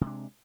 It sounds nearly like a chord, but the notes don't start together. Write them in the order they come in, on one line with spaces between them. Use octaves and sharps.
C3 G#3 D4